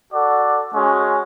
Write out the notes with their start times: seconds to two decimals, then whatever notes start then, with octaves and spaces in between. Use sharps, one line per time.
0.13 F#4 A4 D5 F#5
0.73 G#3 C#4 F#4